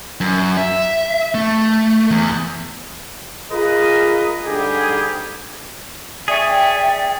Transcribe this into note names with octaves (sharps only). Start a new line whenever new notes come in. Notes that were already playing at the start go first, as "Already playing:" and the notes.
F#2
E5
A3
E2
F4 G#4 A#4 B4 D#5
G#2 D3 G3 G4 G#4
G#4 C#5 D5 E5 G5